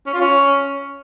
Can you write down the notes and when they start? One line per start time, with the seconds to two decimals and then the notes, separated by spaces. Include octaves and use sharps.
0.06 C#4
0.14 F4
0.21 C#4